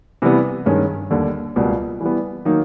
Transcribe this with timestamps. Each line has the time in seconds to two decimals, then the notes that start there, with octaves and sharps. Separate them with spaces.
0.22 C3 E3 G3 B3
0.66 G2 D#3 G#3 C#4
1.11 D#2 D3 G3
1.56 C#2 B2 G3 A#3
2.01 E3 G3 B3
2.45 D#3 F#3 A#3 D#4